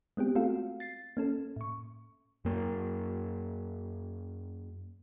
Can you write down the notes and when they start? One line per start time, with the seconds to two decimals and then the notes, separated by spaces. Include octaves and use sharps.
0.17 G#3 B3 C4 G4
0.35 A3 C4 F4 F#4 A4 F5
0.80 A6 C7
1.17 A#3 C#4 A4
1.56 A2 C#6
2.45 F#2 A#3